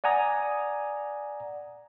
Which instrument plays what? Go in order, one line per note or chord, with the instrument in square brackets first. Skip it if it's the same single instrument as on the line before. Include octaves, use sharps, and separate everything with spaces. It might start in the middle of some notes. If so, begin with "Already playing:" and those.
[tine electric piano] D5 F#5 G#5 A#5 D#6